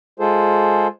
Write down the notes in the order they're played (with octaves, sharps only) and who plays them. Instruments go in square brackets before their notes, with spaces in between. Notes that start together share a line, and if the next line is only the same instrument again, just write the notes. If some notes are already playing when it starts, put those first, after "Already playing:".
[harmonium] G#3 F4 G#4 A4 C5